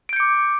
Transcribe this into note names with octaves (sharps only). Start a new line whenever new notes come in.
D6 G6 C#7 D7